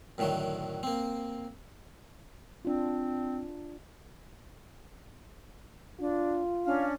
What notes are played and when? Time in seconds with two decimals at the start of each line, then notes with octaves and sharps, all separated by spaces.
0.18 F#2 A2 D3 D#3 F#3
0.83 A#3 C4
2.65 C4 D4 F4
6.00 D4 F4
6.65 C#4 D4 F5